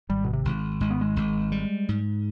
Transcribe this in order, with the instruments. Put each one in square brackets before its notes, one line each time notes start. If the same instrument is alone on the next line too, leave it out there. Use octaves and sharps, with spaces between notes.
[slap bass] G#1 [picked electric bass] G3
[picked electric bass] B2
C3
[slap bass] G#1
[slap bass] G#1 [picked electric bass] G#3
[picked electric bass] B3
G#3
[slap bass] G#1
G3
G#2